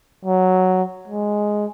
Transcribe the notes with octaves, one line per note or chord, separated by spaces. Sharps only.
F#3
G#3